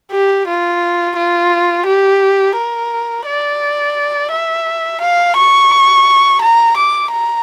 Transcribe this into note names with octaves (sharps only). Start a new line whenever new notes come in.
G4
F4
F4
G4
A#4
D5
E5
F5
C#6
A#5
D6
A#5